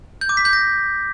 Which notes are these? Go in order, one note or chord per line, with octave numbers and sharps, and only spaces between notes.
G6
D6
B6
G6
A#6